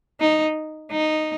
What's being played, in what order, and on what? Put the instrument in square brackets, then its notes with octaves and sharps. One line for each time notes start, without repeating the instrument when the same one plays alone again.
[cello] D#4
D#4